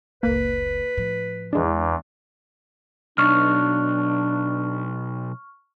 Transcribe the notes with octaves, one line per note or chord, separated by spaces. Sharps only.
F#1 C#2 A#3 B4
A2 F3
E2 E3 G#3 D4
B1 D4 C#6 F6